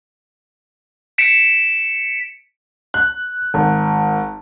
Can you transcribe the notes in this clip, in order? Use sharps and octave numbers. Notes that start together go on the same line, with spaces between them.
B6 C#7 D7 E7
F#6
G#1